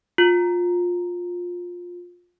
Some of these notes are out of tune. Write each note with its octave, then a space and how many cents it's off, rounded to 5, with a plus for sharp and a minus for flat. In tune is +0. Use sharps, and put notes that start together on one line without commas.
F4 +20